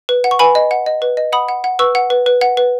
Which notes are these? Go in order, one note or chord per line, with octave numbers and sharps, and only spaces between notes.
B4
F#5
C#6
B4 G#5 B5
D#5
F#5
D#5
B4
D#5
F#5 B5 D#6
F#5
F#5
B4 C#6 E6
F#5
B4
B4
F#5
B4